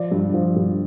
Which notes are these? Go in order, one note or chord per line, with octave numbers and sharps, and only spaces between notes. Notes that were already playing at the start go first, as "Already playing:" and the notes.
Already playing: F3 D5
G2
F3
G2